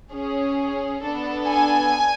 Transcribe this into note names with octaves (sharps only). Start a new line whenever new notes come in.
C#4 G#4
B3 D4 A4
G#5